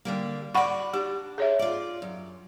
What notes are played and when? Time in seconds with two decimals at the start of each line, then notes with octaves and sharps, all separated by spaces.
0.05 D3 G3 A#3
0.54 F#4 D5 F#5 B5 C#6
0.93 D4 G4
1.38 G#4 C#5 E5
1.59 F4 D5
2.02 F#2